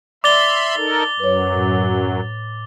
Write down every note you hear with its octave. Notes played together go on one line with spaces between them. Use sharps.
D5 E5 B5 C6 D6 A6 G7
D#4 A4 A#4
F#2 F#3 B4 C#5
A2